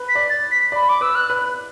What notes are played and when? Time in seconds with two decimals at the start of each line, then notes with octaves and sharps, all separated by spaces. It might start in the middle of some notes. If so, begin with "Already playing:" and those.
Already playing: B4
0.09 B6
0.15 D5
0.30 A6
0.51 B6
0.72 D5 B5
0.89 D6
1.01 B4 E6
1.15 F#6
1.30 B4